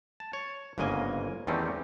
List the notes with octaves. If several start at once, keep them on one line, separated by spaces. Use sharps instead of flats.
A5
C#5
G1 G#2 C#3 A#3 D#5 G#5
E2 D#3 G3 A3 C4 C#4